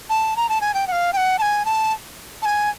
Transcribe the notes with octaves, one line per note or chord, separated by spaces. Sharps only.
A5
A#5
A5
G#5
G5
F#5
F5
G5
F#5
A5
G#5
A5
A5
G#5